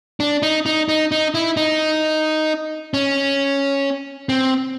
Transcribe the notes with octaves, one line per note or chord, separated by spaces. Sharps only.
D4
D#4
D#4
D#4
D#4
E4
D#4
C#4
C4